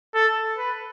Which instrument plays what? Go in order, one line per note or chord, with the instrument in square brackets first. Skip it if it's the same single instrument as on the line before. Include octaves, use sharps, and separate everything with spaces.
[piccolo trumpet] A4
B4